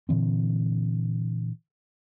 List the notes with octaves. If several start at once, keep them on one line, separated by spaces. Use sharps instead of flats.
A#2 D3 E3 C4